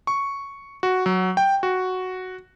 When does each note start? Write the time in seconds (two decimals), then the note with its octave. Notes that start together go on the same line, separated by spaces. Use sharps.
0.07 C#6
0.83 F#4
1.06 F#3
1.37 G5
1.63 F#4